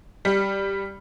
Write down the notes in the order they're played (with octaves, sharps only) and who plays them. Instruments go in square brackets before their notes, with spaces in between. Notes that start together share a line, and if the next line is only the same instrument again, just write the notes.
[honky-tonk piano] G3